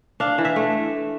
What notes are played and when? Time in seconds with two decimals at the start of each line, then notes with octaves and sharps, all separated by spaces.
0.20 D4 F5
0.38 E3
0.45 E5
0.56 A3